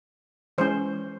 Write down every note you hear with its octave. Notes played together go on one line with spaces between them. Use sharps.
E3 G#3 C#4 C5